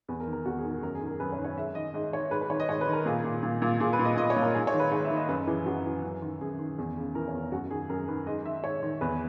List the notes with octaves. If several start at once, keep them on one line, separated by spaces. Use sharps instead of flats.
E2 B4
A#4
D#3
A#4
E2 F#4
G#4
D#3
A#4
F#2 A#4
G#4
D#3
A#4
F#2 B4
C#5
D#3
C#5
G#2 E5
D#3 D#5
G#2 D#5
D#3 C#5
G#2 B4
B4
D#3 C#5
D#5
G#2 C#5
B4
D#3
A#4
A#2 G#4
A#2
A#2
A#2
A#2 G#4
B4
A#2
D#5
A#2 D#5
C#5
A#2
A#4
G#2 G#4
C#5
D#3
B4
G#2 C#5
E5
D#3
D#5
F#2 B4
E3 G#4
F#2 F#4
E3
F#2
D#3
F#2 G#4
D#3
E2
C#3
E3 A#4
C#5
E2
F#2 F#4
D#3 G#4
F#2 A#4
D#3 B4
G#2 D#5
D#3 E5
G#2 C#5
D#3
E2 B4